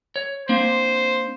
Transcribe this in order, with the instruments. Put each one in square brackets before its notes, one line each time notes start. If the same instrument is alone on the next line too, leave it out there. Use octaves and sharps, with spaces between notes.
[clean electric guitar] C#5
[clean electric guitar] A#3 C4 D4 [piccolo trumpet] C5